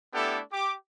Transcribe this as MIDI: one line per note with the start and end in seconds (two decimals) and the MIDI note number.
0.13 0.39 57
0.13 0.39 59
0.13 0.39 62
0.13 0.39 64
0.13 0.39 67
0.13 0.39 69
0.51 0.73 67
0.51 0.73 86